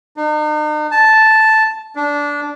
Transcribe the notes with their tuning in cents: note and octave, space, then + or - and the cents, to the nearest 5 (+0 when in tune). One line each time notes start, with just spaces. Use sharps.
D#4 -45
A5 -5
D4 -15